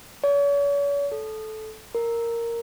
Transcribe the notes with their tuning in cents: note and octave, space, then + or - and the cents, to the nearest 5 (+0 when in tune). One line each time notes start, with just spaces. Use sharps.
C#5 +40
A4 -15
A#4 -5